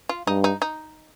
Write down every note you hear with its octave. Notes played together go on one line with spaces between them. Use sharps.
F4
G2 D#4
D#4
D#4